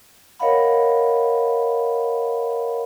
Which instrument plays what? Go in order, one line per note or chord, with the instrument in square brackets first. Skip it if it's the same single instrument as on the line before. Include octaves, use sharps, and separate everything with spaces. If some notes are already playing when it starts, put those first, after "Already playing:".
[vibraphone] A#4 C#5 D#5 F5 F#5 B5